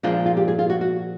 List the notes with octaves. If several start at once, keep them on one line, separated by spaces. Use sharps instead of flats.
A#2 F3 G#3 D4
F4
G4
G#4
F4
F#4
F#4